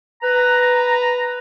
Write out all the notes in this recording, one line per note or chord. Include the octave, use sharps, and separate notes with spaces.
B4 A#5